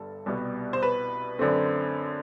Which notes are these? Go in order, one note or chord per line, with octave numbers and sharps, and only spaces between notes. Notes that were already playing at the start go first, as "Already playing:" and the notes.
Already playing: G1 G2 A4
C2 B2 G3 B3
C5
B4
F#2 D3 A3 C4